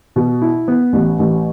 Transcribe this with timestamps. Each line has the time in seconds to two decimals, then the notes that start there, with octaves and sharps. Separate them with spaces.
0.16 B2
0.42 E4
0.68 B3
0.93 A1
1.19 A1